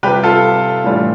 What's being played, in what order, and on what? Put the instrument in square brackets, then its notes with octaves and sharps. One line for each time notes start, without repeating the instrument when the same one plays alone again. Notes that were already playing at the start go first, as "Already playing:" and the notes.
[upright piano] C3 G3 C4 F4 G4 B4
F4 A4
A2 E3 G3 D4 F4